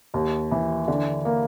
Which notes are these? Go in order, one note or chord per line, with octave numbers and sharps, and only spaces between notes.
D#2
E3
D3
A#3